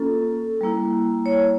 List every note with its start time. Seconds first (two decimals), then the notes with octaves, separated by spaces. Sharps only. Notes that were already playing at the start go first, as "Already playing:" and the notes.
Already playing: A#3 C#4 F4 A4
0.61 G3 A#3 E4
1.26 C#5